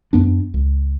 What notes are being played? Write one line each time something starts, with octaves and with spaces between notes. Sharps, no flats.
F#2 B3 D4
C#2